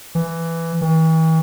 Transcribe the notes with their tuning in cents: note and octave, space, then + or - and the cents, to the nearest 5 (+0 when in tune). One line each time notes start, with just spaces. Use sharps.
E3 +10
E3 -40